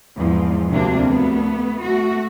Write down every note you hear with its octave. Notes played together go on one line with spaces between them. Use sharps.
E2 G#2 F3
D2 C3 A#3 D4
A3 B3
A3 F#4